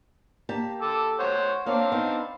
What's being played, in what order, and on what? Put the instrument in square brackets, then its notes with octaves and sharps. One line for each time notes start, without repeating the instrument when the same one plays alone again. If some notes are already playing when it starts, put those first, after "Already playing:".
[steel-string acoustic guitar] A#3 G4 A5
[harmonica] A4 D6
C5 C#5 F#5
[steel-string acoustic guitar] A#3 C#5 D5 [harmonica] C4 D4 F5
[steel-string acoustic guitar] B3 D#4